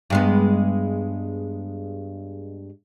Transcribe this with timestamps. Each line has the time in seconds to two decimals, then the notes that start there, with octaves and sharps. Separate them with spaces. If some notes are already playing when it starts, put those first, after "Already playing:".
0.10 G2 G#3 B3